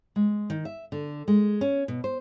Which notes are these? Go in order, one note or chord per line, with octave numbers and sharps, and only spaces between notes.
G#3
D#3
E5
D3
G#3
C#4
B2
C5